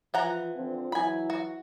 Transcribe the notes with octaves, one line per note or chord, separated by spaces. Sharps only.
E3 F3 F#5 A#5
D3 F3 C4
E3 F#3 E4 G#5 B5
F#4